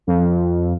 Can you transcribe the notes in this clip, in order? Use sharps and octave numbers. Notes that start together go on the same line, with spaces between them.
F2